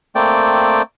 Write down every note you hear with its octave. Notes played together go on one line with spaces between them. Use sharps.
A3 A#3 C4 D5 G5